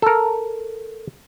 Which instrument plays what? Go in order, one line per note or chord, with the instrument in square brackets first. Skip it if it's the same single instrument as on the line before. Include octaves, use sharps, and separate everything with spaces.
[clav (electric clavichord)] A4 A#4